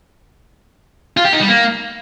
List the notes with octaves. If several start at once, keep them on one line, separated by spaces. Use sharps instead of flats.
F4
G4
D#4
G3
A#3